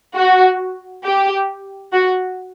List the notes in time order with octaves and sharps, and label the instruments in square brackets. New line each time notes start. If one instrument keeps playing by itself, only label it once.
[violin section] F#4
G4
F#4